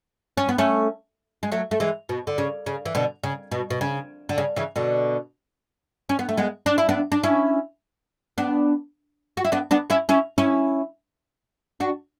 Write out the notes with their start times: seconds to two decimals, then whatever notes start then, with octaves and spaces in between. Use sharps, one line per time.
0.37 C#4
0.49 B3
0.58 A3 C#4
1.43 G#3
1.52 F#3 A3
1.71 A3
1.80 E3 G#3
2.09 B2
2.27 D3
2.38 C#3
2.66 C#3
2.86 E3
2.95 B2 D3
3.24 C#3
3.51 B2
3.70 B2
3.81 C#3
4.29 D3
4.38 C#3
4.56 C#3 E3
4.76 B2 D3
6.09 C#4
6.19 B3
6.29 A3
6.37 G#3 B3
6.66 D4
6.78 E4
6.89 B3 D4
7.12 D4
7.23 C#4 E4
8.38 B3 D4
9.37 F#4
9.45 E4
9.52 B3 D4
9.71 B3 D4
9.90 C#4 E4
10.09 C#4 E4
10.38 C#4 E4
11.80 D4 F#4